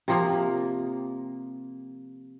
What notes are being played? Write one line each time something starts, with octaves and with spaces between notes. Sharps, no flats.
C3 F3 A#3